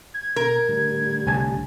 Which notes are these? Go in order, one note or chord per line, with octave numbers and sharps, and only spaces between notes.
G#6
B2 A#4
A2 D3 G3
C2 G#5 A5